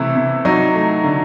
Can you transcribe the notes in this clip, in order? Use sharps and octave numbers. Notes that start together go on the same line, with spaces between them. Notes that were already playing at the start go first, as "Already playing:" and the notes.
Already playing: C3 E3 A3 E4
C3
F#3 D#4
A3
D3